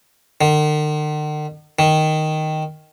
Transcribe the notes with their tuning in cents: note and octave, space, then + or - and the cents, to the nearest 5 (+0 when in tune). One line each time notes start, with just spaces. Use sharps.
D#3 -45
D#3 +0